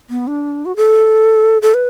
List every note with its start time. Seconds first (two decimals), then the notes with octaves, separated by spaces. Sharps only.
0.10 B3
0.27 D4
0.66 F#4
0.76 A4
1.62 A4
1.74 B4